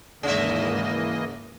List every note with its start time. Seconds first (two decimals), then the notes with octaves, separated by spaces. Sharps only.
0.23 D#2 G#2 C#3 E3 A#3 D#5 E5